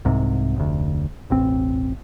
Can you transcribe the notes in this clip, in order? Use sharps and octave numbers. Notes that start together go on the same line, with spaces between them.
C2 G#2 C3
F1 D2
E1 A1 C4